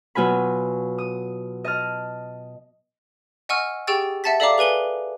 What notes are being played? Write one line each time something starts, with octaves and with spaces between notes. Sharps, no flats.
B2 F#3 F4 G#5 B5
D#6
D#5 A5 F6
D#5 F#5 G#5 C#6 E6 F6
G4 G#4 G5 C#6 E6 A6
E5 F#5 A5 A6 B6
A4 D5 E5 F5 A#5 D6
G#4 B4 G#5 G7